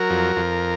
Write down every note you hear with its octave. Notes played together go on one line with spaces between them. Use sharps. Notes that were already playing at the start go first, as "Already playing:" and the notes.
Already playing: F#3 A#4
F2
F2